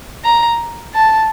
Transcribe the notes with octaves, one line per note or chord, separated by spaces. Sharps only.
A#5
A5